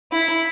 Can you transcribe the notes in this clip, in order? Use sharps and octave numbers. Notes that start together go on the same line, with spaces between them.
E4